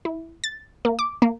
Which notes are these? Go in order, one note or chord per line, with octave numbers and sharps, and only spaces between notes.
E4
A6
A#3
D6
A#3